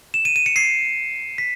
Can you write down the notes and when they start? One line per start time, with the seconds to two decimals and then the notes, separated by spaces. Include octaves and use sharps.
0.14 E7
0.25 D#7
0.36 D#7
0.46 C#7
0.56 C7
1.38 B6